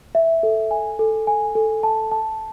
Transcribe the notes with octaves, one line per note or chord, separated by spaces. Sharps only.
E5
A4
G#5
A4
G#5
A4
A5
A5